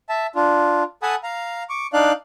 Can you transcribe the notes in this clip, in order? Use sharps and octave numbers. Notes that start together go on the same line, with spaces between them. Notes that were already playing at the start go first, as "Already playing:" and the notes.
E5 A5
D4 F4
A4 F#5 G#5 A5 B5 D#6
F5 A#5
C#6 D6
D4 D#4 D5 F5 F#6